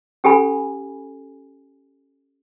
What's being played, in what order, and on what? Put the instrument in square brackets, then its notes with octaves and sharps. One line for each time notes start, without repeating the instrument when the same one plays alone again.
[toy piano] C#4 G4 A4 G#5 B5